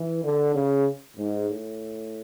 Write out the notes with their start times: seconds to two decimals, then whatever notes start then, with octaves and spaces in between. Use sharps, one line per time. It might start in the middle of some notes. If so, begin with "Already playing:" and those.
Already playing: E3
0.23 D3
0.55 C#3
1.17 G#2
1.49 A2